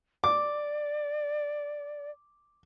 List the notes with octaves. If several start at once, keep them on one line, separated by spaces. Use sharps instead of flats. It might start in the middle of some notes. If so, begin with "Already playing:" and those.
D5 D6